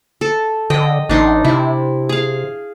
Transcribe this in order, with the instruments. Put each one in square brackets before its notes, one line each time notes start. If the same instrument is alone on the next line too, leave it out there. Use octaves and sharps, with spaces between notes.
[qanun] A4
[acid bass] D3 [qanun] D#5 G5
[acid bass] A1 [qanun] D4 D#4 C6
[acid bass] C3 [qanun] E4
[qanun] G#4 F5